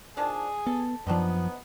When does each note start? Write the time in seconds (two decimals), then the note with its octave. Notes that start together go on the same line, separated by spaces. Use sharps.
0.17 D#3 F3 D4 G#4
0.66 B3 A4
1.07 F#2 F3 B3 C4 D4 D#4